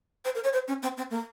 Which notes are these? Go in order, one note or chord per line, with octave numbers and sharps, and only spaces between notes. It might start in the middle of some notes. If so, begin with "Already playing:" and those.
C5
A#4
C#5
C5
C#4
C4
C4
A#3